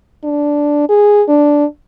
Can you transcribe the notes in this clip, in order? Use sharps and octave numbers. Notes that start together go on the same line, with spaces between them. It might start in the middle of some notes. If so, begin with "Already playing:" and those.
D4
G#4
D4